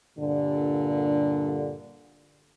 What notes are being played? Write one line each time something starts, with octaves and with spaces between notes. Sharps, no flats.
G2 A#2 D3